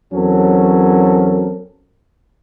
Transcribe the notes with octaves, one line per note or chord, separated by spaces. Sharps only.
E2 F#3 C4 C#4 A4 A#4